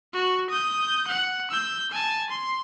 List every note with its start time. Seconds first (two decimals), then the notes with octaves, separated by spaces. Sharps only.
0.14 F#4
0.50 D#6 G6
1.07 F#5
1.51 E6 G6
1.91 G#5 A5
2.30 C6